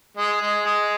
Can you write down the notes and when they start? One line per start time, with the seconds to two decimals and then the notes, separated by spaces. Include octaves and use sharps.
0.17 G#3
0.41 G#3
0.66 G#3